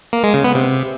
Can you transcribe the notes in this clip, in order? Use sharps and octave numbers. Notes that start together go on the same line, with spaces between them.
A#3
G#3
C#3
B3
C3